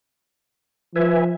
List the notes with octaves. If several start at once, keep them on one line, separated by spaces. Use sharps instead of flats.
F3 B4 E5 G#5